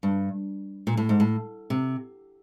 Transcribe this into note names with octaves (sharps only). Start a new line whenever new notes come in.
G2
A#2
A2
G#2
A2
C3